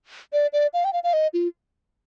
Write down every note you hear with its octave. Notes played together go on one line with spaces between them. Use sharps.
D5
D5
F5
G5
F5
F5
D#5
F4